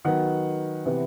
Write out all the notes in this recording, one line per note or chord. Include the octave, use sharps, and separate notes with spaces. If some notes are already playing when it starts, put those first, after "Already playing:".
D#3 F#3 B3 F#5
C3 E3 B3